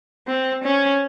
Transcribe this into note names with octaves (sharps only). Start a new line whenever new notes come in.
C4
C#4